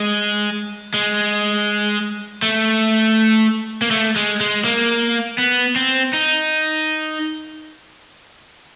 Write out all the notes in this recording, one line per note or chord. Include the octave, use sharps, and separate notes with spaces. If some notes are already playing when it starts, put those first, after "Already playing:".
Already playing: G#3
G#3
A3
A#3
A3
G#3
G#3
A#3
B3
C4
D#4